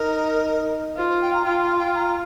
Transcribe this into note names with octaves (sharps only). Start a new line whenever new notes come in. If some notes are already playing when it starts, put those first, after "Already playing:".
Already playing: D#4 A#4
F4 C5
C5
G5
A#5
F4 G5
F5
G5
A#5